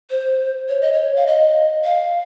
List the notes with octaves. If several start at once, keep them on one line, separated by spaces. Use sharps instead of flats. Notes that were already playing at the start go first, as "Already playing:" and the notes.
C5
C#5
D#5
C#5
F5
D#5
F5